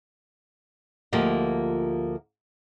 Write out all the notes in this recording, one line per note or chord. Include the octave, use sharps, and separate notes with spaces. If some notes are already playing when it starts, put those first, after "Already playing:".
D2 F3 A#3 F4 G4 D#5